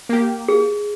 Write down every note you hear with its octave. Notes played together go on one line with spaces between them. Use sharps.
A#3 G4
G#4